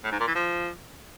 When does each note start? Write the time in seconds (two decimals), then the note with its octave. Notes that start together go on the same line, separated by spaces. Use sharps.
0.04 A2
0.12 G#2
0.20 A#2
0.27 E3
0.35 F3